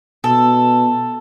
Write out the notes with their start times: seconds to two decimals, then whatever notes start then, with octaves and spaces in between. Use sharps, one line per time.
0.24 B2 A4